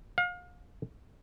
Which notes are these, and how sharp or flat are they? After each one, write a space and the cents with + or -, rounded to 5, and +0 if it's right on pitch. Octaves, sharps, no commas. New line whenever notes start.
F5 +35